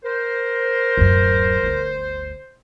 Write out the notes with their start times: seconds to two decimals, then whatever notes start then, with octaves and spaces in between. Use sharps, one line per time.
0.05 A#4 C5
0.97 D1 F#2
1.63 G1 D2